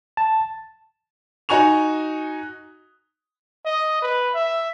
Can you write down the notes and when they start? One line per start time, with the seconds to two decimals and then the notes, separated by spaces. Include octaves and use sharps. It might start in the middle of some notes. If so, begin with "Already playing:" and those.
0.17 A5
1.49 D#4 F#4 G#5 C#6 F7
3.65 D#5
4.02 B4
4.34 E5